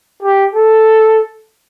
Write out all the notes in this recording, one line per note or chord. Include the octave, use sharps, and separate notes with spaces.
G4
A4